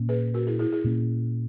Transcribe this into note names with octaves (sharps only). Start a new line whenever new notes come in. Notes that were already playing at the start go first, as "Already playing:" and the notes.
Already playing: A#2 A#3 C#4
G#4 B4
F#4 A#4
E4 G#4
E4 G#4
E4 G#4
A#2 A#3 C#4